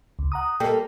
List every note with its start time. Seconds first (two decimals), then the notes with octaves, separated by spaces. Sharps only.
0.19 C#2
0.32 F#5 A#5 D#6
0.60 G3 A#3 A4 D#5 G5